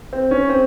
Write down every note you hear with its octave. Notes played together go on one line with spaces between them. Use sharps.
C4
C#4
C4